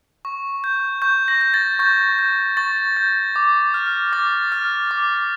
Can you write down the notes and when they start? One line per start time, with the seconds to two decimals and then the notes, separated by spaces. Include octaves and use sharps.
0.25 C#6
0.64 G6
1.02 C#6 G6
1.28 A#6
1.41 G6
1.54 A6
1.79 C#6 G6
2.19 G6
2.57 C#6 A6
2.97 G6
3.36 D6
3.74 F6
4.13 D6 A6
4.52 F6
4.91 D6